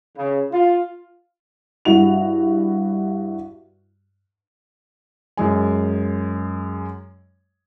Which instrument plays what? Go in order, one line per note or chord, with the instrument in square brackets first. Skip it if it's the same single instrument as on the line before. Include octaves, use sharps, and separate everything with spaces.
[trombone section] C#3
F4
[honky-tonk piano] G2 E4 F#4 F7
[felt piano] F#2 G#3 G#5